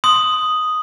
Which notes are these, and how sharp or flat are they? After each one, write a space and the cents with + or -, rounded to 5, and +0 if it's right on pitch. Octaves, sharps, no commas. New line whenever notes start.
C6 +0 D#6 +0